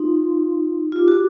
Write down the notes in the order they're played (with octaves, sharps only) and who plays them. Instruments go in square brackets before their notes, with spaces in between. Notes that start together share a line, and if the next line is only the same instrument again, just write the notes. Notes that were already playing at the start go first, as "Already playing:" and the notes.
Already playing: [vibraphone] D#4 [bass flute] F4
[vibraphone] F4 [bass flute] G4
[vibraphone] F#4